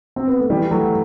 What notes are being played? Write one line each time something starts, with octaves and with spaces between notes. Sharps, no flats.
C4
B3
A3
E3 G3
F#3 A3